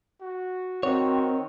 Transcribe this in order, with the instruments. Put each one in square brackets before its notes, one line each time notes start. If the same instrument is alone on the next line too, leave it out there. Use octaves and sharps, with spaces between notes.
[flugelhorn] F#4
[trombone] D#3 [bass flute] C4 [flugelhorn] F#4 [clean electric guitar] C#5